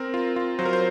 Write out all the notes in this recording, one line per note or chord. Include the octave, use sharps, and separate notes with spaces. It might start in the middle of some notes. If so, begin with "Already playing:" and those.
Already playing: C4 A#4
F4
F4
F#3 C5
A#4
C5